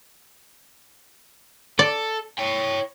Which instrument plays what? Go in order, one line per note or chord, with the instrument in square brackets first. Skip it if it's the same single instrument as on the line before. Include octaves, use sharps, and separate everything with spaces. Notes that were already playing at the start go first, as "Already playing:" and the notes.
[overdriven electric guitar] A4 [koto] D5
[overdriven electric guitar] C#5 G5